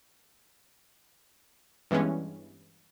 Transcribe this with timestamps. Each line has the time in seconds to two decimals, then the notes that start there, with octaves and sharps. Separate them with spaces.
1.91 G2 E3 G#3 B3 C#4